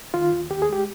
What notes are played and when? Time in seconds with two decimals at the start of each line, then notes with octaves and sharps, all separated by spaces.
0.14 D#3 F4
0.32 D#2
0.51 D#2 G4
0.62 G#4
0.69 G#3 G4